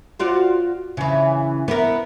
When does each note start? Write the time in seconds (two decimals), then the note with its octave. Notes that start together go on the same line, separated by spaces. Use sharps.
0.20 F4 F#4 D5
0.97 C#3 E3
1.68 B3 E4 A#4